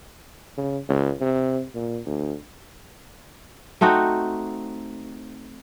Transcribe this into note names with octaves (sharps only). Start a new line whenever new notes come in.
C#3
C#2
C3
A#2
D2
A3 C4 D#4 F#4